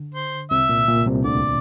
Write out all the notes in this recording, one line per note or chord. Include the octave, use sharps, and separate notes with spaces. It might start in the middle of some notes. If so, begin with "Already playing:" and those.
Already playing: D3
C5
C2 C3 E5
A#2
A#2
C2 C3
D2 D3 D5